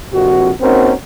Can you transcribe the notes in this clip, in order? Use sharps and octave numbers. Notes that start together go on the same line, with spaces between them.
A#1 F2 C3 F#4
A#3 C4 C#4 D#4 F#4 A#4